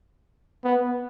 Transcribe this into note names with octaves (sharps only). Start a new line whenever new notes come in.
B3